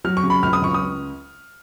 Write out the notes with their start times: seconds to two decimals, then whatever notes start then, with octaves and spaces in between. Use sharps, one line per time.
0.04 F#3 F6
0.17 C#6
0.23 C#3
0.30 B5
0.43 C#2 F6
0.53 D#6
0.62 C#2 C#6
0.74 D#6